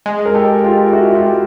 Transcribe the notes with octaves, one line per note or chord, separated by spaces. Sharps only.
G#3
A#4
G4 A4
F4 G4
E4 F#4
F4 G4